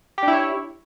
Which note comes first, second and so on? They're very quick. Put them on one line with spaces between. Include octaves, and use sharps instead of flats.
G4 D4 E4 C#5